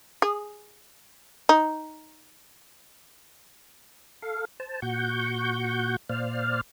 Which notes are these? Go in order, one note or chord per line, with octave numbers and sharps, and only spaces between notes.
G#4
D#4
A4 F5
C5 A5
A#2 F#4 F#5 C#6 G6
A#2 C5 D5 F5 F6